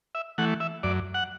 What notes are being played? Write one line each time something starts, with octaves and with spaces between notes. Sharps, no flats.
E5
E3 A3 F#5
E5
F#2 D5
F#5